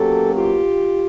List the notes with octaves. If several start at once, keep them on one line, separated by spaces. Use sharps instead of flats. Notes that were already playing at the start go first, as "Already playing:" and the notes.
Already playing: B2 F#3 A#3 C#4 G4 A4
F4 G4